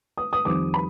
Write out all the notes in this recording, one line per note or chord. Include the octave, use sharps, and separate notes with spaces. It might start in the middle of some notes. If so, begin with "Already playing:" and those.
D#6
D#6
F2 D#3 G3 C4 D6
B5